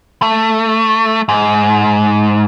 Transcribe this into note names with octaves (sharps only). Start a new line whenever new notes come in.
A3
G#2